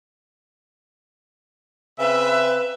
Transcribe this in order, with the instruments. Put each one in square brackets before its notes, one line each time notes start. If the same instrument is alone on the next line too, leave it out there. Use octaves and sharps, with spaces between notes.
[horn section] C#3 C4 E5 [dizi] B4